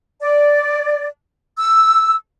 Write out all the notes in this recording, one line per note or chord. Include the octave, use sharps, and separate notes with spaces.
D5
E6